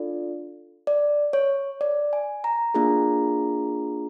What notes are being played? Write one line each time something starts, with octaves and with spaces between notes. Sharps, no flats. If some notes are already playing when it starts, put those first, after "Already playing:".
Already playing: D4 F4 A4 D5
D5
C#5
D5
G#5
A#5
A#3 D4 F4 G#4 A#5